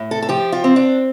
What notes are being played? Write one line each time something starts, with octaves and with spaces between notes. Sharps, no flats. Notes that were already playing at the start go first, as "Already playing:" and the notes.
Already playing: A2
A4
A4
F3 G4
F4
C4
D4